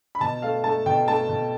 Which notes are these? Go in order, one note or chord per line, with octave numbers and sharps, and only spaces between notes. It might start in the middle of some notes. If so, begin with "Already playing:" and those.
B5
B2 A5
A3 F5
A3 A5
B2 G5
A3 A5
B2